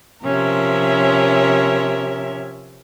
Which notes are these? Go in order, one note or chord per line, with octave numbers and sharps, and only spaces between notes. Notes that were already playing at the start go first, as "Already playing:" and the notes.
C3 F3 C#4 A#4 E5